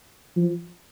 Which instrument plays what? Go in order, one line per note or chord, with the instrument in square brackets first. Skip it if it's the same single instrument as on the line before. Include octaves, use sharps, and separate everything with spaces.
[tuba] F3